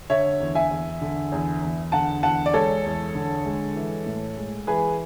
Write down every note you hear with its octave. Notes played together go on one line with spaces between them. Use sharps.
D3 C#5 E5
E2
E5 G#5
E2
D3
E2
E2
D3 F#5 A5
E2 F#5 A5
D5
G#3 A4 C#5
E2
D3
G#3
E3
A2
G#3
E3 G#4 B4